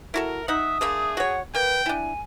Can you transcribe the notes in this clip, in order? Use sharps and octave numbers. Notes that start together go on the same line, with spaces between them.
E4 F#4 A4 A#4
D#4 E5 F#5 D#6
D3 A3 A#3 G#4
F#4 C#5 F#5
A#3 B4 G5
D4 E4 G#5